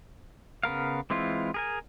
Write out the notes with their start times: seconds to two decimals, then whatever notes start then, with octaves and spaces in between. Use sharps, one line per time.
0.63 C#3 B3 A#4 F5
1.10 E3 G#3 C4 E4 F4
1.54 G#4 A#4 G#5